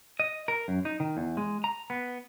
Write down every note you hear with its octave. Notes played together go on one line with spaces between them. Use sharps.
D#5
A#4
F#2
D#4
D#3
E2
G#3
A#5
B3